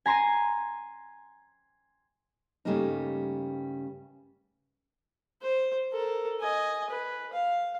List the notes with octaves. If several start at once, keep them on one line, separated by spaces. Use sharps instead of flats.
G#5 A#5 C6 A#6 D#7
G2 C#3 G3 A3 A#3 D#4
C5
A4 A#4
D#5 G#5
B4
F5